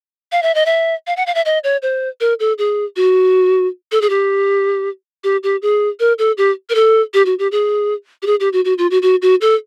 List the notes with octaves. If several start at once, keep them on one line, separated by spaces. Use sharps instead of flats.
F5
E5
D#5
E5
F5
F#5
F5
E5
D#5
C#5
C5
A#4
A4
G#4
F#4
A4
G#4
G4
G4
G4
G#4
A#4
A4
G4
A#4
A4
G4
F#4
G4
G#4
G4
G#4
G4
F#4
F#4
F4
F#4
F#4
F#4
A4